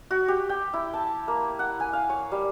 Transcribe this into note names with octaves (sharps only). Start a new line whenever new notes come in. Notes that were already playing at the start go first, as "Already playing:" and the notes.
F#4
G4
G5
E4
A5
A#3
F#5
G#5
F5
C#5
G3